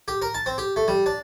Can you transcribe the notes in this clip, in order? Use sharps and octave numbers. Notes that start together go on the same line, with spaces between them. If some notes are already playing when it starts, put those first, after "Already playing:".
G4
A#4
A5
C4
G4
A3
G3
D4